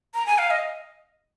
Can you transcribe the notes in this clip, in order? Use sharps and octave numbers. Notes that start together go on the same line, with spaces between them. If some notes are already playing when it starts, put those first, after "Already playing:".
A#5
G#5
F5
D#5